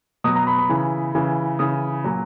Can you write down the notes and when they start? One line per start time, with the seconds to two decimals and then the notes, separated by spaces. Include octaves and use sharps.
0.24 B2 F#3 D#6
0.36 A#5
0.47 B5
0.58 B5
0.69 C#3 E3
1.15 C#3 E3
1.59 C#3 E3 D#6
2.04 A#2 F#3